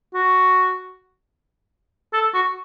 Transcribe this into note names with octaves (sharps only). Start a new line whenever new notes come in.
F#4
A4
F#4